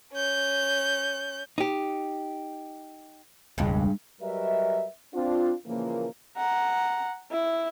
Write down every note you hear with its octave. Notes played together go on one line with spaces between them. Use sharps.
C#4 G6
D#4 G4
E1 C#2 G2 G#3
F#3 G3 A#4 B4 D#5 E5
C4 D4 F4
A#2 C#3 E3 F3 A#3
F#5 A#5
E4